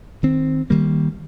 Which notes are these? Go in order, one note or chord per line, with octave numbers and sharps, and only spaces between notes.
D#3 C4
D#3 G3 A#3